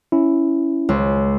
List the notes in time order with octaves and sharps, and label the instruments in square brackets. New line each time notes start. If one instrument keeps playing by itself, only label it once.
[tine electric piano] C#4 E4
[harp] C#2